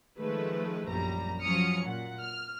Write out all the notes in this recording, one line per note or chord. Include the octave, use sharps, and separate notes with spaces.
D#3 F3 G#3 A3 B4
A#1 F#2 G3 A#5
F3 F#3 C#4 D#6 F6 C#7
A#2 F#5
F6